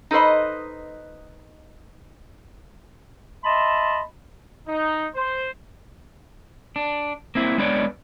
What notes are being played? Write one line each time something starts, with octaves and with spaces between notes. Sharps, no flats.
D#4 A4 B4 C5 D#5
D#5 E5 A5 B5 C6
D#4
C5
D4
A#3 C4 E4
G#3 B3 D4 B4 C#5 D5